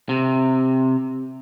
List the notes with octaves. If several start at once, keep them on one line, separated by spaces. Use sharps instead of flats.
C3